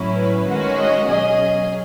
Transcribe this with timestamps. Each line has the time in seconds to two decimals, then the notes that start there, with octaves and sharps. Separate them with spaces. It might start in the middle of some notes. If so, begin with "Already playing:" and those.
Already playing: A2 F#3 C#4 E4
0.15 B4
0.46 D#3 G#3 C#4 F#4
0.77 D#5
1.09 B2 F#3 C#4 G#4 D#5